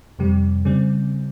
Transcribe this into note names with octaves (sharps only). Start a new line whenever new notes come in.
F2 C3 G3
C#3 G3 C4